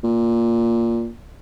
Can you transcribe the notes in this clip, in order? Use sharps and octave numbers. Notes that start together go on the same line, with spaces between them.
A#2